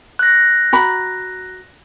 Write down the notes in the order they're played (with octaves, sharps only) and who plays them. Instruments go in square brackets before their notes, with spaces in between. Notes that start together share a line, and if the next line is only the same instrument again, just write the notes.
[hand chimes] F#6 A#6
[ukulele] F#4 A#5 B5